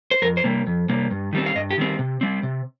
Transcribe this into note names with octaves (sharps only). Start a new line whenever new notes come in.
C5
F2 A#4
C5
C3 G3 A#3
F2
C3 G3 A#3
G2
D#3 G3 C4
F5
G2 D#5
G4
D#3 G3 C4
C3
G3 C4
C3